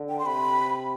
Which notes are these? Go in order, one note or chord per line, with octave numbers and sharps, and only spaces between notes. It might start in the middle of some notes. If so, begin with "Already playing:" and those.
Already playing: D3
G5
C6
C3 B5